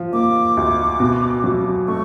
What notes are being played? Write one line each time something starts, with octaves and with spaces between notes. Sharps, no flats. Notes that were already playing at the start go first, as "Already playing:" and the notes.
Already playing: F3
A#3 D6
D2
B2
F#3
A3 C#6